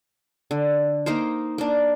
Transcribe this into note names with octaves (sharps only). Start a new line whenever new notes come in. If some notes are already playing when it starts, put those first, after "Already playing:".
D3
A#3 D#4 A#4 C5
A#3 D4